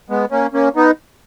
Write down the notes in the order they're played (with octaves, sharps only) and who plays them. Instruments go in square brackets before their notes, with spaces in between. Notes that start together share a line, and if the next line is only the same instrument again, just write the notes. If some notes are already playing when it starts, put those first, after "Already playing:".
[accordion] G#3 B3
A#3 C#4
A#3 C#4
B3 D#4